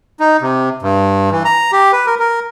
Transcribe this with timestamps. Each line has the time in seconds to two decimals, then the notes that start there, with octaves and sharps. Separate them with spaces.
0.20 D#4
0.41 C3
0.82 G2
1.32 E3
1.45 A#5
1.72 G4
1.93 B4
2.07 A#4
2.20 A#4